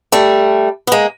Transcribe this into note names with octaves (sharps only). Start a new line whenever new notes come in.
G3 A3
B3
G#3 A#3